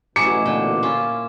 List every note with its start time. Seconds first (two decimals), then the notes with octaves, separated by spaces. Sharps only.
0.16 A1 B2 F#3 E4 G#4 D6 C#7
0.45 A#2 D3 G5
0.83 C#4 E4 F4